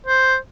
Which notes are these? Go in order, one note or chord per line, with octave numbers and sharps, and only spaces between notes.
C5